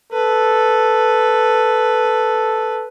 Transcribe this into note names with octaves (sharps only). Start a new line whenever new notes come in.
A4 B4